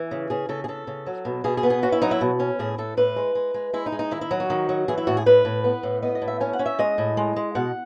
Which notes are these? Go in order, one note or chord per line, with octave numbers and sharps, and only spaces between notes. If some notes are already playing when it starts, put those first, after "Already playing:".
Already playing: E3
C#3
C#3 G#4
C#3 A4
G#4
C#3 A4
C#3
F#3
B2
B2 G#4
G#4
B3
G#4
C#4 F#4
E4
F#3 D#4
E4
B2
C#4
A2 G#4
A2 A4
A2 B4
G#3
G#3
G#3
G#3 E4
D#4
G#3
D#4
D#3 E4
E4
F#3
F#4
D#3
F#3
E3 G#4
E4
A2 F#4
G#4
A2 B4
A2
B3
A2
B3 D#5
D#5
A2
E5
C#4 G#5
F#5
C#4
E5
G#3 D#5
A2
G#3
G#3
B2 F#5